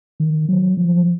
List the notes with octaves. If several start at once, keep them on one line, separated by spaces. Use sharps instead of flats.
D#3
F#3
F3